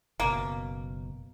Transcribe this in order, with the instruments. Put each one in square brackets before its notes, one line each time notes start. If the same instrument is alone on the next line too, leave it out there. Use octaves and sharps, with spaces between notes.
[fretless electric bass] F#1 B2 [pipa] A#3